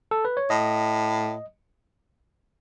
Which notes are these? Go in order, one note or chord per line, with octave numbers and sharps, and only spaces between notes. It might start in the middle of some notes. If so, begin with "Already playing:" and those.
A4
B4
C#5
A2 D#5